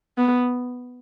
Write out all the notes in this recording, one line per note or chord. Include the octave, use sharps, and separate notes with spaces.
B3